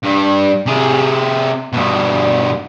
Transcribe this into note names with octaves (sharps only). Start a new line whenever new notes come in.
G2
C3 G#4
G2 B2